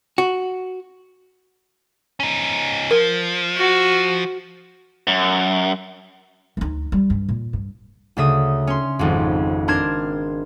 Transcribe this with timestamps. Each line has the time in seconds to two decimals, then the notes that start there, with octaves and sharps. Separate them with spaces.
0.18 F#4
2.20 C#4 D#4
2.91 F3 A#4
3.57 F#4
5.07 F#2
6.57 D2 D#4
6.92 G3
7.10 G2
7.29 A#2
7.53 G2
8.17 D2 C#3 E5 D#6
8.67 C#4 C6
8.99 G#1 F2
9.68 D4 A#4 C6 G#6 E7